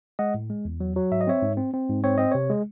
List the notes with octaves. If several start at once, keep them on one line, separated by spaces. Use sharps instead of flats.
G#3 D#5 F#5
A2
G#3
E2
F#3
F#3
G#2 E5
D#5
C4 C#5 E5
G#2
C4
C4
G#2
C4 C#5
C4 D#5
C3 C#5
G#3